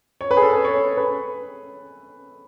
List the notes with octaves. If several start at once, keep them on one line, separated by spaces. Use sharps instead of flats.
C#5
B4
G#4
A4
B4
C#5
B4